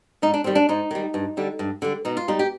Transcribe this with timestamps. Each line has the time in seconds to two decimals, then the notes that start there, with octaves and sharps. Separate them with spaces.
0.22 G#2 D#4
0.34 D4
0.44 D#3 G3 C4
0.55 D4
0.69 G#2 D#4
0.91 D#3 G3
1.14 G2
1.37 D3 G3
1.59 G2
1.82 D3 G3
2.05 B2 D#4
2.17 F4
2.28 G3 D#4
2.39 G4